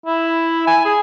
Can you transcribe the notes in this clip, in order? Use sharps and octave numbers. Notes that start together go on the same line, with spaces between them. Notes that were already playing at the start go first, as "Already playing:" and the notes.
E4
G#5
G#4